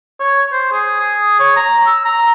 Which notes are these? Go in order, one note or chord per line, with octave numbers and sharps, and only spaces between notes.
C#5
C5
G#4
G#4
C#5
A#5
E6
A#5